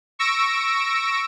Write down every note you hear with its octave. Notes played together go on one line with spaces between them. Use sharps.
C#6 E6 A#6 D7